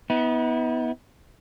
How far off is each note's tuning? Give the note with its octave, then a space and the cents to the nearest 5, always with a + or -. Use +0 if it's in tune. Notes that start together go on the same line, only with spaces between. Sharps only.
B3 +0 E4 -45